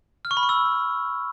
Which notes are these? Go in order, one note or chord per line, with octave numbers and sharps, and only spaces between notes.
F6
C#6
B5
C#6
E6